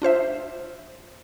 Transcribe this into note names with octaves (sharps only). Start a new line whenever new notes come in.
D4 F4 C5 E5